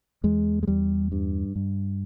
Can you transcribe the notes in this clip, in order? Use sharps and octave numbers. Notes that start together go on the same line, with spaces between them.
E2 G#3
G#3
E2 G3
G2
G2